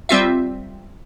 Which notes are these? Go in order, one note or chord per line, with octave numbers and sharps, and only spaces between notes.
G3 C4 F4 E5